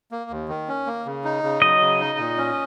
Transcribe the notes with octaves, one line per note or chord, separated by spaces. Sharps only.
A#3
D#2
D#3
C#4
A#3
C#3
D#4
C#3
F#3 D#5
C#3
D#4
A#2
C#4